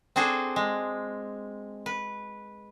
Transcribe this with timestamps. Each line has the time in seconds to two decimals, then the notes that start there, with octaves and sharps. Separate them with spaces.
0.16 C4 D4 F#4 G#4 A4 C5
0.56 G#3
1.86 B4